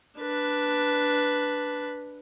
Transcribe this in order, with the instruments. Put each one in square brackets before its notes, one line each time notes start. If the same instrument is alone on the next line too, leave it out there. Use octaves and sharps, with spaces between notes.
[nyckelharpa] D4 B4